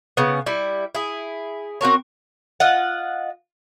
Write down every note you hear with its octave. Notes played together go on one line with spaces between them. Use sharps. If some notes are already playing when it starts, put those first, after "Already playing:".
C#3 B3
G3 E4
E4 G#4
C4 F#4 A#4 C#5
F4 D#5 F#5